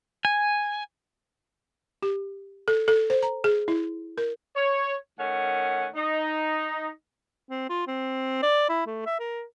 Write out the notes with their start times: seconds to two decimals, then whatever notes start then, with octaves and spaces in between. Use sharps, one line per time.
0.25 G#5
2.03 G4
2.68 A4
2.88 A4
3.10 C5
3.23 A#5
3.44 G#4
3.68 E4
4.18 A#4
4.56 C#5
5.19 D#3 A3 C#4 F#5 G#5
5.96 D#4
7.49 C4
7.69 F4
7.87 C4
8.43 D5
8.69 E4
8.86 A3
9.06 E5
9.19 A#4